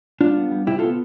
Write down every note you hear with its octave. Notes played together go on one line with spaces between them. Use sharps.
G3 D4 F4
B3
G3
C3 E4 G4
B3 F4 A4